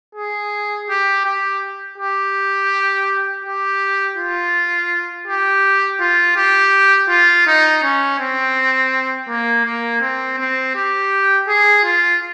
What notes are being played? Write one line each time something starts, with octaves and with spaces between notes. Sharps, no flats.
G#4
G4
G4
G4
G4
F4
G4
F4
G4
F4
D#4
C#4
C4
A#3
A#3
C4
C4
G4
G#4
F4